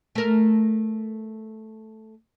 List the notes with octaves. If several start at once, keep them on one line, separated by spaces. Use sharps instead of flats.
A3 A#4